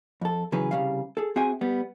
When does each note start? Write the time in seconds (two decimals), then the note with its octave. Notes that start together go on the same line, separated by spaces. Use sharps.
0.21 F2 A4
0.52 C#3 E3 F#3 C#4 G#4 B4
0.71 C2 G#2 C#3 G3 F5
1.17 G#4 A4
1.36 C4 F#4 G#4 E5 G5 G#5
1.61 G3 B3